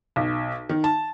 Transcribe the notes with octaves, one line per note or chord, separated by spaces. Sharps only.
B1
D#3
A5